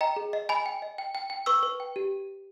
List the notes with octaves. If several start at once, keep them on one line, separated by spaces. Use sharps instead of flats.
D#5 G5 A#5
G#4
D#5
D#5 G#5 B5
G5
D#5
G5
G5
G5
B4 C#6 E6
B4
G5
G4